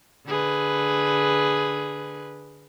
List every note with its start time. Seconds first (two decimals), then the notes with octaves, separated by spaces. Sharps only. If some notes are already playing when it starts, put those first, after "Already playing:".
0.27 D3 G#4 B4